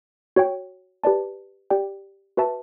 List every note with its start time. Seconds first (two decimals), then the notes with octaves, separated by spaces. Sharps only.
0.36 F#4 C#5 G5
1.04 G4 B4 D5 A5
1.70 G4 D5 G5
2.37 F#4 B4 E5 A5